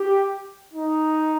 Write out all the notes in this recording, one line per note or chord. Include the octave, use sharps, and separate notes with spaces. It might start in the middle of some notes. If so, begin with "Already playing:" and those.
Already playing: G4
D#4